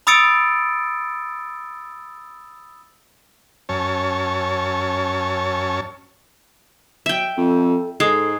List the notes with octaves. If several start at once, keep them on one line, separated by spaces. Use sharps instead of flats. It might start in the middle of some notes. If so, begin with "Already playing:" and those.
B5 D#6 E6 A6 C#7 D7
F#2 C#4 C#5 A5
F#3 E5 G5
F2 A4
G#2 G#3 A4 D#6 C7